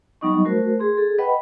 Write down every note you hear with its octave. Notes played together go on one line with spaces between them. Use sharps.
F#3 G3 B3 D#4 D#5 C#6
A3 F#4 A#4 C5
G#4 C6
G#4 A4
B4 D#5 F#5 G5 B5